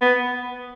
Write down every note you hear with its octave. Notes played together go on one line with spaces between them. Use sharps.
B3